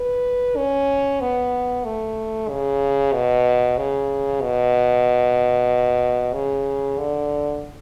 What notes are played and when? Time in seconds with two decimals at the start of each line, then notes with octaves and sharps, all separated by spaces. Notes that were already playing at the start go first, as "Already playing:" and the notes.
Already playing: B4
0.57 C#4
1.21 B3
1.85 A3
2.49 C#3
3.13 B2
3.78 C#3
4.42 B2
6.34 C#3
6.99 D3